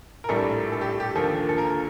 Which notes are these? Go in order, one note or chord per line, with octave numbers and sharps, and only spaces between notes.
A#4
A#1 A2 G3 D4 A4
A4
G4
G4
D#2 D3 F3 A#3 A4
A4
A#4